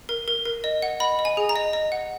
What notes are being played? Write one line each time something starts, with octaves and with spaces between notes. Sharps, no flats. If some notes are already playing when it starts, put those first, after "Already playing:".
A#4
A#4
A#4
D#5
F#5
D#5 B5
D#5
G#5
G#4
A#5
D#5
D#5
F#5